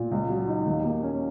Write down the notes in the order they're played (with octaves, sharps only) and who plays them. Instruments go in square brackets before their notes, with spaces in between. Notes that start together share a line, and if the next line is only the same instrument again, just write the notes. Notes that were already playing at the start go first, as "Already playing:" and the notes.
Already playing: [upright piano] A#2
C#2
F#3
D#4
D#2
A#3
C#4